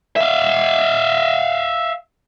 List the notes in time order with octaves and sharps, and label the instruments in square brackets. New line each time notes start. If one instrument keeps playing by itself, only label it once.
[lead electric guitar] E5 F5